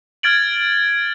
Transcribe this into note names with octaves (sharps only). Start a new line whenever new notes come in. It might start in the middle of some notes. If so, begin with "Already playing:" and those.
F6 G#6 A6 D7 F#7